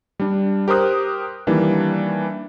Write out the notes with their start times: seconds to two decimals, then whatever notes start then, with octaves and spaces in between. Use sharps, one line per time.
0.20 G3 D4
0.68 G4 A#4 C5 D#6 F#6
1.47 D#3 E3 G3 A#3 D4